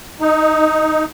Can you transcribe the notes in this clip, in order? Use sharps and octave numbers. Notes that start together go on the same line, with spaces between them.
D#4